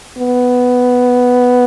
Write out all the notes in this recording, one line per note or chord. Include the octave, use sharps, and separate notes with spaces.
B3